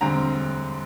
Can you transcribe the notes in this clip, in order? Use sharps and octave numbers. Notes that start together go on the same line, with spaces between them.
E1 D2 D3 G3 C4 A#5